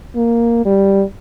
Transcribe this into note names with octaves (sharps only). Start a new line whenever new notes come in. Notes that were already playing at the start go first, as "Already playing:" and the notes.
A#3
G3